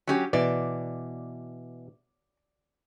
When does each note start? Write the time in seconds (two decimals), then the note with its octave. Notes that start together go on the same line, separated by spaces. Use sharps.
0.07 F#3 C#4 G4
0.33 B2 E3 D5